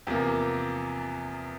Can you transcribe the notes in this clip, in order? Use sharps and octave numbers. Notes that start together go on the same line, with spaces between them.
E2 C3 F3 A#3